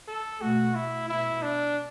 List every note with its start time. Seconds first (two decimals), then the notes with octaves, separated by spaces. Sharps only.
0.08 A4
0.41 B2 A3 F#4
0.75 E4
1.09 B2 B3 E4
1.42 D4